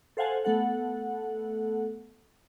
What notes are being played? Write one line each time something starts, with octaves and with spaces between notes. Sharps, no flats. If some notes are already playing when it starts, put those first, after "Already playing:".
A4 C5 F5 F#5 G#5 A5
A3 B3 A4 F#5